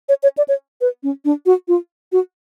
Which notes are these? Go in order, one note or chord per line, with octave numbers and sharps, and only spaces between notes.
C#5
C#5
D5
C#5
B4
C#4
D4
F#4
F4
F#4